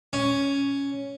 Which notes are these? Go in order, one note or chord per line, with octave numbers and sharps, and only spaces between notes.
C#4